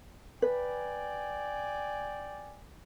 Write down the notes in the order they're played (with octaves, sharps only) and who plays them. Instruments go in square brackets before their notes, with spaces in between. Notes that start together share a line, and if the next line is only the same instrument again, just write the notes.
[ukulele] B4 [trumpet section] D5 G5 G#5